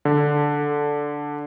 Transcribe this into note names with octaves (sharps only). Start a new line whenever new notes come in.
D3